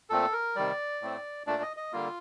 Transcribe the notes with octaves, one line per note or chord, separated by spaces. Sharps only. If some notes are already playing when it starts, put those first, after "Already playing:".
A#2 A3 C4 A4
A#4
C3 D#3 G3 D5
A2 A3 C4
A#2 A3 D4 D5
D#5
D#5
D3 G3 A#3 F4